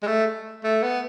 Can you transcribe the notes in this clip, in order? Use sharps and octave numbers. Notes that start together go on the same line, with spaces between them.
G#3
A3
A3
B3